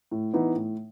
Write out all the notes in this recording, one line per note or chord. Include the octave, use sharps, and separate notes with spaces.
A2
E3 B3 D#4
A2